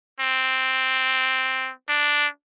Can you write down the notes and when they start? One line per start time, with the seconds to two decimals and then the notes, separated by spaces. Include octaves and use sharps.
0.20 C4
1.89 D4